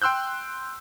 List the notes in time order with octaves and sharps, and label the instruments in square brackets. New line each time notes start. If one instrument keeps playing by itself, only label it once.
[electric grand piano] G5 C6 E6 F#6 G6